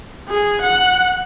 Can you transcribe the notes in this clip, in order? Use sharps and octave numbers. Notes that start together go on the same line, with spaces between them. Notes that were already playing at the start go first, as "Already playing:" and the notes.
G#4
F#5